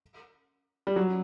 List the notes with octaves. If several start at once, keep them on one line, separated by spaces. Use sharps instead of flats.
G3
F#3